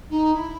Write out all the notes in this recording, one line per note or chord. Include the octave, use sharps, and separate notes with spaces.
D#4
E4